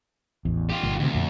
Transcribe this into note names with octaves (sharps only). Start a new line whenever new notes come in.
A1 E2
F4 G4
G1 A#2
D2 C3 D#3
F2 A#2